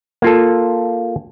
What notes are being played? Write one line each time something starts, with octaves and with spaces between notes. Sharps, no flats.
A#3 F4 A4